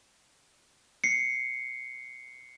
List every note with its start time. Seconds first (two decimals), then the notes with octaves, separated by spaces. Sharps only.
1.04 C7 C#7